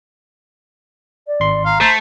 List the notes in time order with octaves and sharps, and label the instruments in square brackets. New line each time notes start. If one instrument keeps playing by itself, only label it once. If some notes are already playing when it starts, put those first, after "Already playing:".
[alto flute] D5
[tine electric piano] G#1 C6
[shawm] F5 [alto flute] A#5
[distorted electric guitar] A3 [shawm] C5